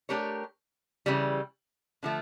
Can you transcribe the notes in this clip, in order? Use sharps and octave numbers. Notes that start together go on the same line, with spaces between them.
A3 D4 G4 A#4 C#5
C#3 E3 G3
D3 F3 A3